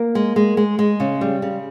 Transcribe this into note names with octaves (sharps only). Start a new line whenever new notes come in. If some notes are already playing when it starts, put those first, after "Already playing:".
Already playing: A#3 A#4
G#3
G#3
G#3
G#3
C#3
G3
C#3